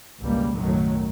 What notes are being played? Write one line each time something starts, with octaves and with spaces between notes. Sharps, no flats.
G#1 C#2 B2 G3 A#3
B1 F#2 A2 D#3 F#3 A3